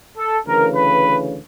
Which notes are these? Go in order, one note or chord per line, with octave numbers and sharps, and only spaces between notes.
A4
D2 C#3 E3 A#4
B4